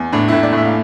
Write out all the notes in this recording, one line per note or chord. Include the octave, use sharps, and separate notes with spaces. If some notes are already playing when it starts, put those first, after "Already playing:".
Already playing: E2
A2 D4
A2 E4
D5
A2 E5
F5